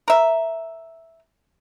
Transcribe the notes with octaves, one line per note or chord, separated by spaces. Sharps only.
A#4 E5